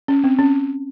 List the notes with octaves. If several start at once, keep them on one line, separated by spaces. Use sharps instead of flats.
C#4
C4
C#4